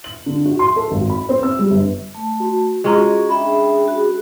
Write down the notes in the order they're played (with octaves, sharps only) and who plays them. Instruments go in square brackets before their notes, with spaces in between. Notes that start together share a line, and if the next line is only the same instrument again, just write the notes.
[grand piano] F#7
D3
F#4
C6
A4
G#1
B5
C4
E6
G3
G1
[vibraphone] A3 A5
[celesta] F#4
[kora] G#3 C#4 [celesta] F4 A#5 [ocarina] F#4 [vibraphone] C#6
[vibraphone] D4 E5 G5 [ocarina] G#4 [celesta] B5
[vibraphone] F#4